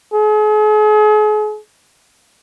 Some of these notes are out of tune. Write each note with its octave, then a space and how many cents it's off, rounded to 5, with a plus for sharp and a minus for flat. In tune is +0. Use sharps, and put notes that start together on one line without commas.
G#4 +40